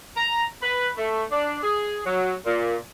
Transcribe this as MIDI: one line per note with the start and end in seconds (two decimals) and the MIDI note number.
0.16 0.44 82
0.62 0.89 71
0.97 1.23 57
1.31 1.58 62
1.63 2.01 68
2.06 2.34 54
2.45 2.75 46